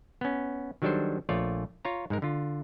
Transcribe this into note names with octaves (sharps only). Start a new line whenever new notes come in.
B3 C#4
D#3 F#3 G3 D4 A4 C5
A#1 A3 F4 C#5 D5
F4 C#5 A#5
G#2 G#3 A#4
D3 F4